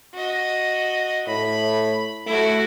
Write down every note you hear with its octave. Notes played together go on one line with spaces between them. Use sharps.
F#4 D#5
A2 B5
A3 E4 F#4